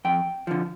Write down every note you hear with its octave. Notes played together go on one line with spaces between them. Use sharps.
F2 G5
D3 F3